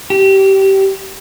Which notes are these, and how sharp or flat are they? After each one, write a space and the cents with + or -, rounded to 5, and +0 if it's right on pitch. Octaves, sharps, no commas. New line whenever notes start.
G4 -20